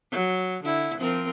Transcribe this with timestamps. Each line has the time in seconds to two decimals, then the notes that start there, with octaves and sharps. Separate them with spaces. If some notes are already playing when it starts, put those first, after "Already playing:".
0.12 F#3
0.64 D3 E4
0.99 F3 C4 A#4